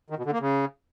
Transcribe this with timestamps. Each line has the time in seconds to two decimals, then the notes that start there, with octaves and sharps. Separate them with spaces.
0.10 D#3
0.18 B2
0.25 D3
0.33 A#3
0.40 C#3